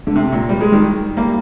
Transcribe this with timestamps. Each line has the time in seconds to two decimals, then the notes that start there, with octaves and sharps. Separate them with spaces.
0.07 D3
0.16 C3
0.32 A#2
0.49 G3
0.61 G#3
0.72 D#3 G3
1.17 G3 A#3